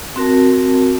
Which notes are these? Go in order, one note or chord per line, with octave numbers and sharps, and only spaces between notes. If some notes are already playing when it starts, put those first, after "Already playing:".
C4 F#4 A#4 A5